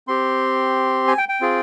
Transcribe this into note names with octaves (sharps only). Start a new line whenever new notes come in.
C4 G4 C6
G#5
G5
G5
C4 F4 G#4